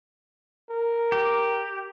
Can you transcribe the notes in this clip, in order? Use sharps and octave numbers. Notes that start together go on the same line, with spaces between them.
A#4
G4